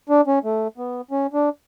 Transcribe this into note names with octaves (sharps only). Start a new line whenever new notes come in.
D4
C#4
A3
B3
C#4
D4